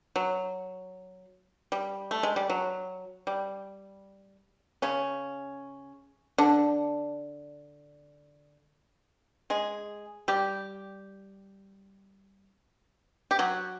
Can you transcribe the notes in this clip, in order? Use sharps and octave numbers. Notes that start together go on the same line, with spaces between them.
F#3
G3
A3
G#3
G3
F#3
G3
C#3 C#4
D3 D4
G#3 G#4
G3 G4
G4
F#3 F#4